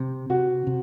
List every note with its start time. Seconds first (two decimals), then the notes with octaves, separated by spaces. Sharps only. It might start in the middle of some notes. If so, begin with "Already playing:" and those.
Already playing: C3
0.30 C3 F#4
0.67 C3